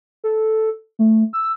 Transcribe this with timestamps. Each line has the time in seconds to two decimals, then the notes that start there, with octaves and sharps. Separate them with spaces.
0.24 A4
0.99 A3
1.33 E6